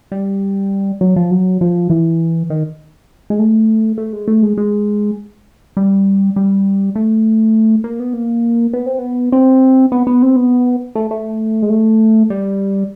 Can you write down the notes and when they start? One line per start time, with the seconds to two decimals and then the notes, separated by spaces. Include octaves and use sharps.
0.12 G3
1.01 F#3
1.16 F3
1.31 F#3
1.61 F3
1.90 E3
2.50 D#3
3.30 G#3
3.39 A3
3.98 A3
4.13 G#3
4.28 A3
4.43 G#3
4.58 G#3
5.77 G3
6.36 G3
6.96 A3
7.84 A#3
8.00 B3
8.14 A#3
8.73 B3
8.86 C4
8.99 B3
9.32 C4
9.92 B3
10.07 B3
10.22 C4
10.36 B3
10.95 A3
11.11 A3
11.62 G#3
11.70 A3
12.30 G3